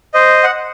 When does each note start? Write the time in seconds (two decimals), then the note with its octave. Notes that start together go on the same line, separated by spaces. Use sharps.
0.14 C5 D#5
0.43 F#5